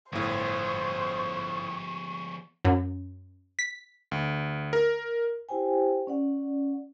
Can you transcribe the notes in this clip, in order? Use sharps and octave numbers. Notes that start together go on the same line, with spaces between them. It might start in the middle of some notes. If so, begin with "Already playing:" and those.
G1 A2 F3 B3 C5 C#6
F#2
B6
D2
A#4
E4 G4 C5 G5 G#5
C#4 D5 F#5